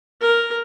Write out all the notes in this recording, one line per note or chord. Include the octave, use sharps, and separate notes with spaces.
A#4